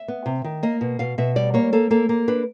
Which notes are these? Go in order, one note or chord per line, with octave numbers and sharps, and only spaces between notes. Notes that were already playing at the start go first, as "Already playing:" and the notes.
Already playing: E5
B3
C3
D#3
A#3 D#5
B2
B2 F5
B2 E5
G3 D5
A#3 C#5
A#3 A4
A#3 A4
A#3
D4 B4